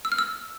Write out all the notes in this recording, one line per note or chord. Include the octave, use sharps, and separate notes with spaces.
E6
F6
E6